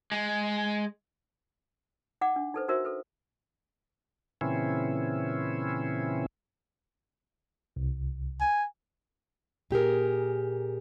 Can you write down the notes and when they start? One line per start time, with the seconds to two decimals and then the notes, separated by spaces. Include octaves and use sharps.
0.12 G#3
2.21 D#4 F#5 D6
2.36 D4
2.54 D#4 A4 B4 C5
2.68 D#4 F#4 A#4 C5 E5
2.85 A4 B4
4.41 A#2 C#3 E3 C4 C#4 E4
7.76 C2
8.41 G#5
9.71 A#2 G4 G#4 A#4